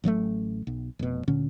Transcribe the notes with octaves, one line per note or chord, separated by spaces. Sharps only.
A1 F#3 G#3 A3
B1
F1 B2
D2 A#2 D3 C#4